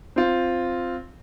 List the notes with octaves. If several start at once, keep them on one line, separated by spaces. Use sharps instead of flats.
C4 F4